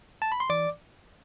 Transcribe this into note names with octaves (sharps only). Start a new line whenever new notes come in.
A5
B5
C6
E3 D5 D6